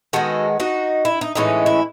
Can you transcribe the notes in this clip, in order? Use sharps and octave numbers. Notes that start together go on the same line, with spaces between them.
D#3 G#3 B3 F#4 A4
D#4 F#4
E4
D#4
A2 E3 G#3 C#4 D#4
E4